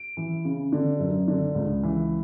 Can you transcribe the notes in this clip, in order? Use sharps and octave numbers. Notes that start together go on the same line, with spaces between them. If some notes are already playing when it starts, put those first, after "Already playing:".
Already playing: D7
E3
C#3
D3
F#2
D3
C#2
E3